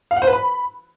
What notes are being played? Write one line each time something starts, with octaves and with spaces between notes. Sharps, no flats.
F5
F#5
C5
B4
B5